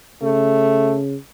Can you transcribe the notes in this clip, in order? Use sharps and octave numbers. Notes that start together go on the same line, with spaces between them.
C#3 A3